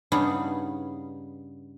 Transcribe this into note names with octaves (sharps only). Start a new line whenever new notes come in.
G2 C#3 B3 D#4 G#4 B4